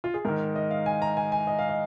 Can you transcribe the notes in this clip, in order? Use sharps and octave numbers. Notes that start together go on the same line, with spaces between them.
F4
G#4
G#2 D#3 A#4
D#5
F5
G#5
A#5
G#5
G#5
D#5
F5
D#5